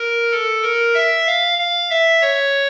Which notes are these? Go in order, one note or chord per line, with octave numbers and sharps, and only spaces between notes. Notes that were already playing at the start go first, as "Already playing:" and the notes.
Already playing: A#4
A4
A#4
E5
F5
F5
E5
C#5